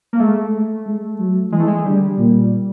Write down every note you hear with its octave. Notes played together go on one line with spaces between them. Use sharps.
A#3
G#3 A3
G#3
F#3
E3 G#3
A3
G#3
D3 G3
A#2